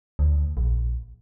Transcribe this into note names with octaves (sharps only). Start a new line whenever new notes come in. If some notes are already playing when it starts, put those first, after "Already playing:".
D2
A#1